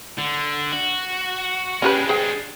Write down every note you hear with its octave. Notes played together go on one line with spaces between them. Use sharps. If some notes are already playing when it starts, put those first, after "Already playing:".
D3
F#4
G#3 C#4 D4 G4 B4
G#4 C5 G5